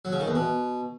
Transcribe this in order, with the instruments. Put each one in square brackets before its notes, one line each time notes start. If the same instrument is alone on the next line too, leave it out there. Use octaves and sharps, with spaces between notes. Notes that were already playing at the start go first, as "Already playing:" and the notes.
[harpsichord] F#3
C#3
D#3
E2
B2